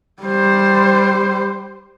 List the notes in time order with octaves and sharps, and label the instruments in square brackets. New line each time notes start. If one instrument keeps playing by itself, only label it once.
[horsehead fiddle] G3 C5